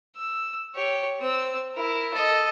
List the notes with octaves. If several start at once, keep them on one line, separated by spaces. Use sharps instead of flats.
E6
G4 C#5
C4 E6
E4 A#4
A4 D#5